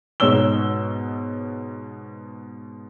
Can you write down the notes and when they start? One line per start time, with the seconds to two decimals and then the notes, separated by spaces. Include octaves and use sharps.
0.20 G#2 B2 C#5 E6 G7